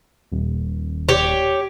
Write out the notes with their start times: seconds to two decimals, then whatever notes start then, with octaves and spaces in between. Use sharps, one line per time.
0.32 D#1
1.09 G4 C#5